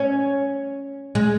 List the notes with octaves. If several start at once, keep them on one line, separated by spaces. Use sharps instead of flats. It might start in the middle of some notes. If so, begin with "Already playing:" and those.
Already playing: C#4
G#3